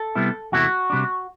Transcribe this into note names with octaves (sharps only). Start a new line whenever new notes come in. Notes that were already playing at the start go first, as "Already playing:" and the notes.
Already playing: A4
C3 G3 B3 E4
E2 C3 E3 A3 E4 F#4
C3 G3 D4